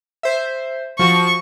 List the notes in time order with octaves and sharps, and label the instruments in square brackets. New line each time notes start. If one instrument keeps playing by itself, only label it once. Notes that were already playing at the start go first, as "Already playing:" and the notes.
[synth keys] C5 E5
[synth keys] F3 F#4 [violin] C#6